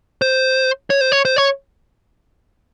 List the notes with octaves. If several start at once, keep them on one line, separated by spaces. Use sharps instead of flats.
C5
C#5
C5
C#5
C5
C#5